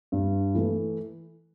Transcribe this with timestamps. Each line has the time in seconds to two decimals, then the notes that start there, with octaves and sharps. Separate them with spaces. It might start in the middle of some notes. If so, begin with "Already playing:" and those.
0.12 G2
0.55 E3 A3